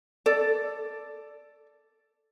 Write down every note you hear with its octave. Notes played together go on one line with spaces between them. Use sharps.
A4 D5